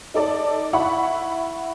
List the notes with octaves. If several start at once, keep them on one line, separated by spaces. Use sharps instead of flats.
D#4 A4 D5 A5
E4 E5 F#5 B5 C#6